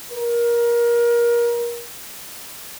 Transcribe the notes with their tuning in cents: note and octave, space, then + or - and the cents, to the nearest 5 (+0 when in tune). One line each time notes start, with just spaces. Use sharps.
A#4 +25